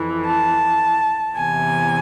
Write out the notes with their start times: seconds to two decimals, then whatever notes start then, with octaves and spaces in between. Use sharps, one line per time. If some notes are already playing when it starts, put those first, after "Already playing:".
Already playing: F2 E3
0.27 A5
1.36 E2 C3 E3 G#5